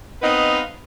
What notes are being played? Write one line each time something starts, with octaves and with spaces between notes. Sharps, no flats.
B3 C4 D#4 B4 D#5 F5